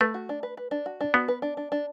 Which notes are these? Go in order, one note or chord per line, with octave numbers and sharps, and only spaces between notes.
A3 B4
F#4
D4
B4
B4
D4
F#4
D4
B3 F#4
B4
D4
D4
D4